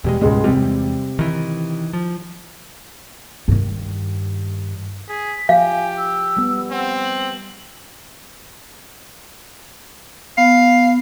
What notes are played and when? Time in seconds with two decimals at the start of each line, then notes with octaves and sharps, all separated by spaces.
0.04 E2 B2 G3 G#3
0.21 C#2 G#2 B2 G#3
0.44 E2 C3 G3 G#3
1.19 D#3 E3
1.93 F3
3.48 G2 D#3
5.09 G#4 B6
5.49 F3 G4 F5 G#5
5.97 E6
6.37 G3 B3
6.71 C4 F#5
7.04 F#7
10.38 B3 F5